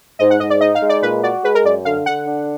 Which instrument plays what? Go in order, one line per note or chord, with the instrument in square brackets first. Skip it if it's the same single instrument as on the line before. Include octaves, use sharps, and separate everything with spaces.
[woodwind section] G#2 [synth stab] D#5
[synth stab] F#5
[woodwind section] G#2 [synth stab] D#5
[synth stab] D5
[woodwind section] D#4 [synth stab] D#5
[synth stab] F5
[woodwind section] G#3
[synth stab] D5
[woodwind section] A#2 [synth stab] B4
[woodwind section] F#4 [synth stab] D5
[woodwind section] G#3 [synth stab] B4
[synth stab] A#4
[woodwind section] F#2 [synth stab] D5
[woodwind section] D3 [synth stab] F5
[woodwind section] D3 [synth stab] F#5
[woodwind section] D4